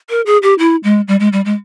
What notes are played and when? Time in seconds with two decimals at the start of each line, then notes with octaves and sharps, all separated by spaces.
0.10 A#4
0.26 G#4
0.42 G4
0.59 E4
0.84 G#3
1.08 G3
1.20 G#3
1.33 G3
1.45 G#3